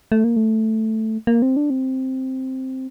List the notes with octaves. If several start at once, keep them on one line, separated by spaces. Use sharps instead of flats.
A3
A#3
A3
A#3
C4
D4
C4